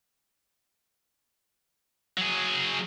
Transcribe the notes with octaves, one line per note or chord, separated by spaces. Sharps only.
F#3 G#4